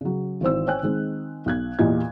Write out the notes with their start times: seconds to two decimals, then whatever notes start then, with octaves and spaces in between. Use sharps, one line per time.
0.01 C#3 F#3
0.41 G#1 E3 C4 C5 E6
0.67 C5 C#5 G5 G#5 F#6
0.83 D#3 G#3 C4
1.46 B1 F#6 G#6
1.79 E2 A#2 A#3 G4 D#5 G#6